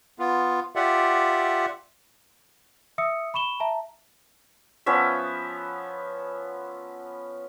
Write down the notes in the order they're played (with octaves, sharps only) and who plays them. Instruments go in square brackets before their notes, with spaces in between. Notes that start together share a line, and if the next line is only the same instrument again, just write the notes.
[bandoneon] B3 F4
F4 G4 D5 E5 F#5
[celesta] E5 D#6 E6 C#7
B5 C#6 E7 G7
E5 A5 A#5
[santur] F3 B3 C#4 E5